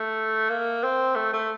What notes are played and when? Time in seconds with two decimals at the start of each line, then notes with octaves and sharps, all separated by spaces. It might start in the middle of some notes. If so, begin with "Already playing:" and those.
Already playing: A3
0.50 A#3
0.83 C4
1.15 A3
1.33 A3